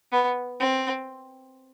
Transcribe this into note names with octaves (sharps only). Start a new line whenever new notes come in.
B3
C4